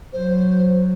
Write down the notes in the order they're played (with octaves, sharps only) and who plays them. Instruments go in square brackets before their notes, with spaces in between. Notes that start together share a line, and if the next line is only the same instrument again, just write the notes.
[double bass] F#3 [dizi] C5